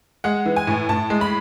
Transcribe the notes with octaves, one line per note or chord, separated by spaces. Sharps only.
G#3 F#5
E3
G#5
A2
A2 A5
G#3
B5